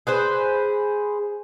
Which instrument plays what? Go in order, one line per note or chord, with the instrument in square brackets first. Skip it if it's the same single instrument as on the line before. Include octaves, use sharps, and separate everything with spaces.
[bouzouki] G#4 B4 C5